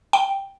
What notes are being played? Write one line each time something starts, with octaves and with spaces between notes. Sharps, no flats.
G5